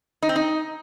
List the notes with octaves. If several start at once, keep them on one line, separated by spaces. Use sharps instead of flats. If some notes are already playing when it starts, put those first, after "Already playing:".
D#4
C4
D#4